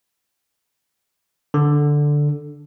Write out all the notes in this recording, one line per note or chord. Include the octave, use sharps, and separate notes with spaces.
D3